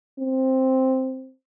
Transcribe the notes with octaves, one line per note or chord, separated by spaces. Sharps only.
C4